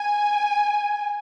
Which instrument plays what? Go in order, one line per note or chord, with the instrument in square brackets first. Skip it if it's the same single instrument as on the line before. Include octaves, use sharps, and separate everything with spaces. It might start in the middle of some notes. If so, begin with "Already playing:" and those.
Already playing: [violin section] G#5